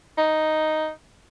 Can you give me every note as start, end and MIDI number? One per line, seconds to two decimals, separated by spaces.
0.18 0.90 63